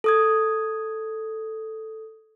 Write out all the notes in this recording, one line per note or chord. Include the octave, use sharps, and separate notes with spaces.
A4 D#6 G#6